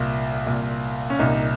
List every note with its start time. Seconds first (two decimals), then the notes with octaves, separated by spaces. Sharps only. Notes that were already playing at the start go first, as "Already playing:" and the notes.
Already playing: C2 A#2 F4
0.47 C2 A#2
1.10 C#4
1.19 C2 A#2 D#4